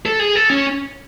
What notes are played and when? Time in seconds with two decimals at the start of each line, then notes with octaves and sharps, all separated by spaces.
0.06 A4
0.20 G#4
0.35 A4
0.50 C#4